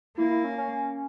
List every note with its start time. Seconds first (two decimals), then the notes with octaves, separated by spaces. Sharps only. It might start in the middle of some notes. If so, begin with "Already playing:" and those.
0.17 A#3 E4
0.30 E4
0.44 C#4
0.58 C#4